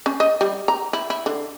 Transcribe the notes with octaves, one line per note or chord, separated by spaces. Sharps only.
C#4
D#5
G3
A#5
E4
E4
D3